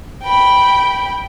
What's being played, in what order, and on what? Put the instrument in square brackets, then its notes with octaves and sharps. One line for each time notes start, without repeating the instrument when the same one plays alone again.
[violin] G5 B5